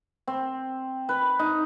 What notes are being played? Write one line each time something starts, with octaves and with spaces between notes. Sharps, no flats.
C4
B4
D#4